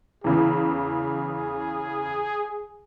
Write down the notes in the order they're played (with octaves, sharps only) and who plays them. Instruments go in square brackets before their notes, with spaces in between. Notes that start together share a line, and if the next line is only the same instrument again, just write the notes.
[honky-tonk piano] E2 C#3 E3 [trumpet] G#4